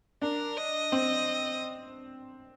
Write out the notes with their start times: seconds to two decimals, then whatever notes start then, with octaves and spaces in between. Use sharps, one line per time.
0.22 D4 A#4
0.57 D#5
0.92 C4